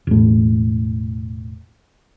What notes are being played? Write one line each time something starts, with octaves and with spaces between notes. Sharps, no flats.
E1 A2